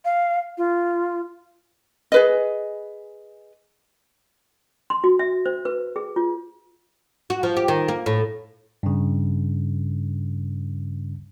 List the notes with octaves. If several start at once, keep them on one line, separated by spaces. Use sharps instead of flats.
F5
F4
G#4 B4 D#5
C6
F#4
E5
C5
B4
G#4
F4
F#4
F3
G4
D#3
A#3
A2
G2 C#3